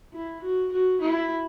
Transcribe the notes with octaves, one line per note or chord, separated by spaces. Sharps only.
E4
F#4
F#4
E4